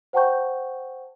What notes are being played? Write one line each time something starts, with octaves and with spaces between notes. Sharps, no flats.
C5 F#5 G5 A5 C#6 G6